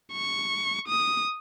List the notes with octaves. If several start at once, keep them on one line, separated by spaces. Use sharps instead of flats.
C#6
D#6